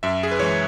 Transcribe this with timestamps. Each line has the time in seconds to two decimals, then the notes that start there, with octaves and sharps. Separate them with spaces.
0.03 F#2 E5
0.23 G#4
0.31 B4
0.40 E3 G#3 C#5